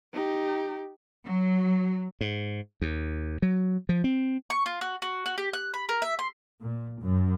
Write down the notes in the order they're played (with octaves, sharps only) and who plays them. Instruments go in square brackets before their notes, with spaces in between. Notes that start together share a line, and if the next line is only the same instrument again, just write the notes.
[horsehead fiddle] D#4 G4
[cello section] F#3
[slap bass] G#2
D#2
F#3
F3
C4
[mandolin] C#6
F4
F#4
F#4
F#4
G4
F#6
B5
A#4
E5
C6
[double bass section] A#2
F#2